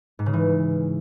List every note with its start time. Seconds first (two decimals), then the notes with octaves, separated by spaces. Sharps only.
0.19 G#2
0.26 C#3
0.33 E3